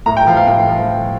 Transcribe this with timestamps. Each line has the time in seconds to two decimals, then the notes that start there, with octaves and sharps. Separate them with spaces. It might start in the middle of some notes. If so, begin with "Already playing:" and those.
0.06 A2 A#5
0.17 G5
0.27 F3 F5
0.37 F5
0.47 A2 G5
0.68 F3